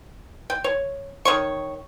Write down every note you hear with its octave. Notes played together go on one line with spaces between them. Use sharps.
G5
C#5
D#3 C#5 C#6